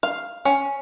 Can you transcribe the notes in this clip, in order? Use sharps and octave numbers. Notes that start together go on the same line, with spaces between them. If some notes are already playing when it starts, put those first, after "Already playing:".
F5
C#4